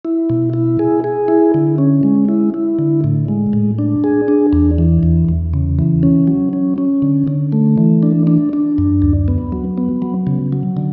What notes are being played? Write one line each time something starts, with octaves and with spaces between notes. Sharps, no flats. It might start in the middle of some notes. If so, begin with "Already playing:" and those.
E4
B2
E4
G#4
G#4
E4
D3
C#4
G#3
E4
E4
D3
A2
G#3
A2
D4
G#4
D4
E2
E3
E2
E2
C#3
E3
C#4
F#3
C#4
C#4
D3
D3
A3
E3
D4
D4
D4
F#2
D2
B3
F#3
B3
F#3
C#3
F#3
D3